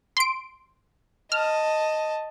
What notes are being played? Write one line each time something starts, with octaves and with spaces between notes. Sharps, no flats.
C6 D7
D#5 A5 F6